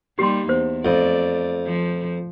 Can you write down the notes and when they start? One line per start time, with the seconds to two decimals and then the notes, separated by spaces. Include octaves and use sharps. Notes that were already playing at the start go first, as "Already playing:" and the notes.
0.19 G3 A#3 D#4 G4 C6
0.49 E2 C5
0.85 F2 A3 D5
1.66 F3